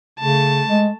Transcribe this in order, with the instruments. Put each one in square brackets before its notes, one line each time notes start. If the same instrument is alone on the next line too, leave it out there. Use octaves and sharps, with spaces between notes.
[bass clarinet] C#3 [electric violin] A3 A5
[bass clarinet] G#3